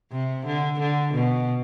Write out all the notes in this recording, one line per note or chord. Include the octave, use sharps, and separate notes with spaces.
C3
D3
D3
B2